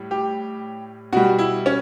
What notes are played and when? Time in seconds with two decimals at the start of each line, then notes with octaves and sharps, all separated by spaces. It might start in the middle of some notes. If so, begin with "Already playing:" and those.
Already playing: A2 G3
0.11 G4
1.13 B2 G3 F#4
1.38 E4
1.66 C#4